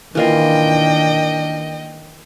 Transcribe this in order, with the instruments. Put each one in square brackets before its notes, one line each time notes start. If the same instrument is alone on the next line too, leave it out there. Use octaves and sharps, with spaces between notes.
[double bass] D#3 D4 [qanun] E3 A#3 F4 [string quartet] D#5 G5